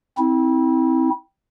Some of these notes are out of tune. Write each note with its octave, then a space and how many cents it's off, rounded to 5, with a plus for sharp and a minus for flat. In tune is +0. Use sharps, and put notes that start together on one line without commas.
C4 +0 E4 -30